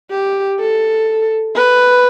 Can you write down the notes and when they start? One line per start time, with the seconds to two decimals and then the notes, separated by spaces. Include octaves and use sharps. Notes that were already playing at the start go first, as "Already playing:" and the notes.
0.11 G4
0.59 A4
1.56 B4